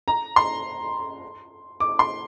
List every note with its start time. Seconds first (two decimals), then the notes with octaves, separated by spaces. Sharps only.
0.08 A#5
0.36 C6
1.80 D6
1.99 C6